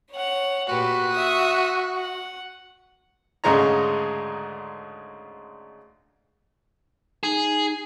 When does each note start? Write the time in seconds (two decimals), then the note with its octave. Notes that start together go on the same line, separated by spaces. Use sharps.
0.12 C#5 F#5
0.68 A#2 F#4 G4 B4
1.10 E5 D#6
1.96 F#5
3.44 D2 G#2 C#3 G#3 D#4 A#5
7.23 D#4 G#4